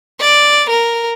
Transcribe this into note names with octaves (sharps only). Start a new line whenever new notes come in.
D5
A#4